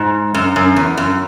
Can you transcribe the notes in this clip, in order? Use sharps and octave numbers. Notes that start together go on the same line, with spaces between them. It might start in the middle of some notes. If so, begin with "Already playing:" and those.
Already playing: G#2
F#2
F#2
E2
F#2